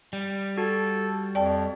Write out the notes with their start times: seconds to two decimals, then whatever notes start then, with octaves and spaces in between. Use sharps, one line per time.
0.13 G3
0.57 F#4 A4
1.35 F2 D5 G5 A5